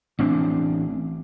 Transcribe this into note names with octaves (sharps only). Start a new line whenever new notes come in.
A1 C4 D4